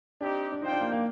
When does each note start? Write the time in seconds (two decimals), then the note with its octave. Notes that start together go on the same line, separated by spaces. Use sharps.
0.21 C4 D4 D#4 G4
0.52 D4
0.61 D#4 F4 C5 G5
0.72 D4
0.81 A#3
0.92 A#3